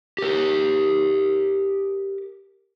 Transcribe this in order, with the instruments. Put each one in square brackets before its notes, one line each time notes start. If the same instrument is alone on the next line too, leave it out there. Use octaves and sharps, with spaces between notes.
[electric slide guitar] G4 A#4